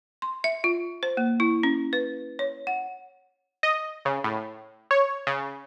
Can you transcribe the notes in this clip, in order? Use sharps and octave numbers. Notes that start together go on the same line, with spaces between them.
C6
E5
F4
C5
A#3
E4
C#4
B4
C#5
F#5
D#5
C#3
A2
C#5
C#3